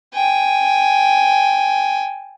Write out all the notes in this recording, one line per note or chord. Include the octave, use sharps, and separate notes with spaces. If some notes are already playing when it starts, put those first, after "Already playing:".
G5 G#5